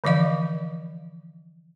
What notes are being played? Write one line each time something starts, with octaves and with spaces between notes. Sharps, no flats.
D3 E3 F3 D#5 F5